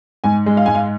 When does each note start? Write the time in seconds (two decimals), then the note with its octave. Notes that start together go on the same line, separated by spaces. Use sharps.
0.24 G#2 G#5
0.46 G#3
0.57 F5
0.66 G#2 G#5
0.75 F5